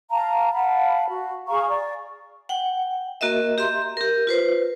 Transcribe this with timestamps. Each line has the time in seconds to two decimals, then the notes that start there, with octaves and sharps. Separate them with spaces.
0.11 F5 A5 A#5
0.53 F5 F#5 A5 B5
1.08 F#4
1.47 G#4 F5 A#5 C#6
1.68 D5
2.49 F#5 G5
3.21 A#3 F#4 A#4 D#5 E5
3.58 G4 E5 A#5 C6
3.97 G4 A#4
4.27 F4 B4 C5